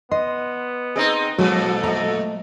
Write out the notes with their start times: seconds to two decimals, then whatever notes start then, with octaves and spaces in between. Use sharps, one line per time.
0.12 B3 D#5 C6
0.96 C4 D#4 G#4 D#5 A#5
1.38 F2 A#2 F#3 G#3 F#4 A4
1.83 A3 D#5 A#5